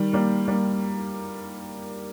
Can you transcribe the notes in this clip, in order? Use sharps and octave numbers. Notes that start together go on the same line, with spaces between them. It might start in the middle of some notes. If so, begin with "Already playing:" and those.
Already playing: D#3 G3
G3 A#3
G3 A#3